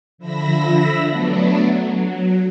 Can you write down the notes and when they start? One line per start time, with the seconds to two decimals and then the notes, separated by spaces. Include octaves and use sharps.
0.18 D3 F3 E5 B5 E6 A#6
1.06 F#3 A3 B3 D4
1.74 F#3